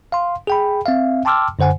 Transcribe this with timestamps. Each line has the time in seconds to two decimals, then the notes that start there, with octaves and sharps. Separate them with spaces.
0.12 F5 C6
0.47 G#4 G5 B5
0.86 C4 E5 F5
1.25 G5 A5 C6 D6 E6 F6
1.59 F#2 D3 C5 F#5 G#5